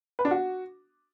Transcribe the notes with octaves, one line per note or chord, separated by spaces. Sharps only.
B4
D4
F#4